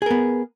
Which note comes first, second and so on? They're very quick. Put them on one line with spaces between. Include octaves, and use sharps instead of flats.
G#4 A#4 B3